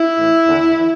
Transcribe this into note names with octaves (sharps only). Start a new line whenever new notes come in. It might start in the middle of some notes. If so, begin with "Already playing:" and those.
Already playing: E4
A2 E3
E2 D3
E3